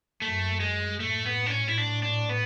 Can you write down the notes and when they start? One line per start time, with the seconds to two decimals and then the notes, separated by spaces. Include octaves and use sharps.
0.22 F#2 A3
0.60 G#3
0.99 A2 A3
1.26 B3
1.46 D4
1.51 C#4
1.68 E4
1.77 D4
2.03 D4
2.29 B3